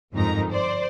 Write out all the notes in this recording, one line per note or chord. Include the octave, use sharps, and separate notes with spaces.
G1 F2 G#2 D#4 A#4 A#5
C5 D5